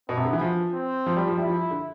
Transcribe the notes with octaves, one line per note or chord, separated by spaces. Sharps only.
B2 B3
C3
D3
E3
F3
C4
F3
G3
F3
G3 E4
F3
D3